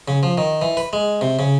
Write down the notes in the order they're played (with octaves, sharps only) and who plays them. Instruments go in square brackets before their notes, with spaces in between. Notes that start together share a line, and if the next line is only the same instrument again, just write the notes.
[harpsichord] C#3
F3
D#3
E3
B4
G#3
C3
C#3